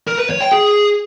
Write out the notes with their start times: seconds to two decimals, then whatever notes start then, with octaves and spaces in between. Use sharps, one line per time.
0.07 A#4
0.18 B4
0.29 C#5
0.41 G5
0.52 G#4